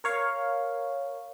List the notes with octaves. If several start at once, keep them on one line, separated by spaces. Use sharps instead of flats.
A#4 C#5 F5